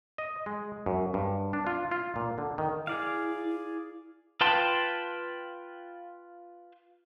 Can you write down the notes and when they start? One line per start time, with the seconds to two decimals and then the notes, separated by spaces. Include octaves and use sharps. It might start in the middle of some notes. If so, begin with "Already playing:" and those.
0.18 D#5
0.46 G#3
0.86 F#2
1.14 G2
1.53 D4
1.67 F4
1.91 F4
2.16 A#2
2.38 D3
2.58 D#3
2.87 E4 G#4 D5 F5
4.41 F4 B4 G5 A5 C6